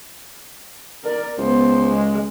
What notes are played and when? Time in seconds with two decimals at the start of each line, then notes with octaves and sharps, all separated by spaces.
1.04 A#4 D5
1.38 C#2 B3 C5
1.90 G#3